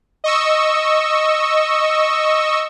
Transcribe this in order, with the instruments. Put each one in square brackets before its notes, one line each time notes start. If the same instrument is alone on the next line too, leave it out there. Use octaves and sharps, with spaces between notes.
[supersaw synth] D#5 C#6 E6